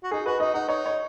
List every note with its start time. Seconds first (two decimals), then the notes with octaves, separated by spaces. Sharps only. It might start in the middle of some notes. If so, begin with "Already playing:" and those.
0.04 F#4
0.11 D#4 G#4
0.26 F#4 B4
0.40 D#4 D#5
0.54 D#4 F#5
0.69 D#4 C#5
0.86 C#5